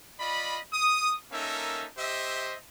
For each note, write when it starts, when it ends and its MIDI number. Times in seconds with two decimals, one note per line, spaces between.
0.20 0.59 65
0.20 0.59 74
0.20 0.59 75
0.20 0.59 83
0.73 1.14 87
1.32 1.87 58
1.32 1.87 61
1.32 1.87 63
1.32 1.87 69
1.32 1.87 70
1.32 1.87 76
1.98 2.55 67
1.98 2.55 72
1.98 2.55 75
1.98 2.55 76